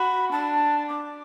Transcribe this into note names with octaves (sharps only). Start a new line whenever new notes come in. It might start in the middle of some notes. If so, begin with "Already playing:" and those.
Already playing: F#4 B5
D4 A5
D6